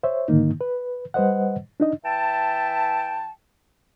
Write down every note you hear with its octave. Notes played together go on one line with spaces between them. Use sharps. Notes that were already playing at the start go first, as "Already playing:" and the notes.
C5 C#5 E5
G#2 D3 D#3 A#3 D#4
B4
G3 B4 C5 D#5 F#5
D4 D#4 D#5
E3 E5 G5 A5